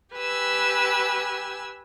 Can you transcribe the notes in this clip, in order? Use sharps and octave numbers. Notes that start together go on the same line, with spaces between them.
G4 B4 G#5 E6